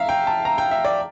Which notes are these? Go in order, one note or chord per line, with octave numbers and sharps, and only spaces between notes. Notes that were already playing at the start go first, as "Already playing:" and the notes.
Already playing: E5 F5 A#5
G5
A5
A#5
G5
E5
D5